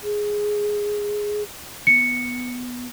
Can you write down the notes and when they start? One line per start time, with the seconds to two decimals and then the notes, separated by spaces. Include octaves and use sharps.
0.03 G#4
1.87 B3 C#7